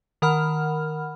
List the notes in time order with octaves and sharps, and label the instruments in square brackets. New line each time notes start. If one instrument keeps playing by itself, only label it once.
[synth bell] D#3 A#4 F#5 B5 F6